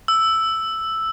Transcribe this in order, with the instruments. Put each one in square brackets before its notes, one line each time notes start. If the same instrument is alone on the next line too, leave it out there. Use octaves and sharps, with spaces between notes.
[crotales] E6